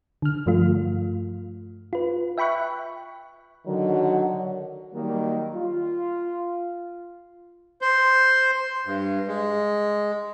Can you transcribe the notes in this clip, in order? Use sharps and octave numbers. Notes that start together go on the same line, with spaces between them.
D3 F6
G2 F3 A3 F4
F4 B4
E5 G5 B5 C#6 F#6
D3 D#3 F#3
D#3 F#3 G3 A#3
F4
C5
G2
G#3